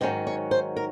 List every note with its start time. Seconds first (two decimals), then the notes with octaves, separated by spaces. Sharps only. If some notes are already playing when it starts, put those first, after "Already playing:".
0.01 G#2 D#3 F#3 C#4 C5
0.27 C#5
0.51 C5
0.76 A#4